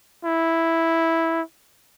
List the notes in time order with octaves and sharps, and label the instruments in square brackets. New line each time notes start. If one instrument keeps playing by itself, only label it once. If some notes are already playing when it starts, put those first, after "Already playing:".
[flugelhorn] E4